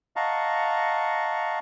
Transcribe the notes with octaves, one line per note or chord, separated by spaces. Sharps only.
D#5 F5 F#5 A5 A#5 C#6